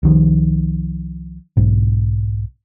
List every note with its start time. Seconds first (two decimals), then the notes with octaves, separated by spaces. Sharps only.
0.03 C2 D#3 F3
1.57 B1 G#2